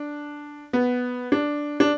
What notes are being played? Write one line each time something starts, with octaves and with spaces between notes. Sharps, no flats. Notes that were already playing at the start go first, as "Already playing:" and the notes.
Already playing: D4
B3
D4
D4